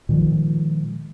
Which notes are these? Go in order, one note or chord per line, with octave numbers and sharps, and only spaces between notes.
A#2 D#3 F3 G#3